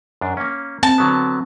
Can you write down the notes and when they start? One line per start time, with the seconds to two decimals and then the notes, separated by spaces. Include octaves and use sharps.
0.21 F#2 D4
0.37 A#3 C#4
0.83 C4 A5
0.98 D3 F#3 B3